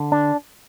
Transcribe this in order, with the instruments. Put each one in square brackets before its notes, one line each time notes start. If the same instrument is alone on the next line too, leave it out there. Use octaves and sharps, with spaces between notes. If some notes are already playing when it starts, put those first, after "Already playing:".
Already playing: [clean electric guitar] D3
D4